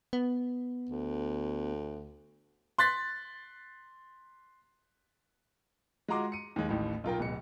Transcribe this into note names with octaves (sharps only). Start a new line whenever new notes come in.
B3
D2
C6 F#6 A6 B6
G#3 F4 F#4 A#5 C6 D6
C#7 D#7
D#2 G#3
A1 D#2 A2
B1 F4 A#4 G5
D1 B2 C#7